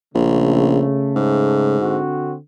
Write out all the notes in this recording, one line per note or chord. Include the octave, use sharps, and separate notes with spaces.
A#1 C#3 A3
G#2
D3 C4 F#4